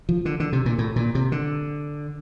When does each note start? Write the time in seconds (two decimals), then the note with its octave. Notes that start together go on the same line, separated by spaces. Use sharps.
0.09 F3
0.25 D3
0.40 D3
0.53 C3
0.66 A#2
0.78 A2
0.96 A#2
1.15 C3
1.32 D3